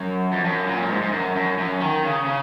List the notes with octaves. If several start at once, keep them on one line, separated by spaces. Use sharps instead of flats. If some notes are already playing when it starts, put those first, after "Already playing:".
Already playing: F#2
F2
F#2
A#2
F#2
G#2
G#2
F#2
F#2
F#2
D#3
C#3
C#3